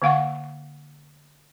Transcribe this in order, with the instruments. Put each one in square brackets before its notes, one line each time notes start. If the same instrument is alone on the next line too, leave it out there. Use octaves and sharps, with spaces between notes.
[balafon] D3 A#3 F5 F#5 C#6